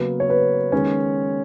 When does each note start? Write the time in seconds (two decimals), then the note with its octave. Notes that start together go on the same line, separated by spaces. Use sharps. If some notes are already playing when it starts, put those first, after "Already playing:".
Already playing: C#3 F#3 A#3 B3
0.20 C#5
0.29 B3 B4
0.72 D#3 G#3 B3 C#4 C#5